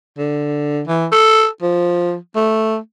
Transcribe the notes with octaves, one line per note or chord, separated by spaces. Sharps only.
D3
E3
A4
F3
A3